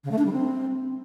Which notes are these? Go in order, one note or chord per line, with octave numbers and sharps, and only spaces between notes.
C#3
A3
D4
G3
C4